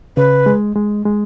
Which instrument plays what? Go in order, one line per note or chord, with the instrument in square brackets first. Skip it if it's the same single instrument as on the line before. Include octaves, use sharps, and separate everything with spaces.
[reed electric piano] C#3 [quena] B4
[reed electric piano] G#3
G#3
G#3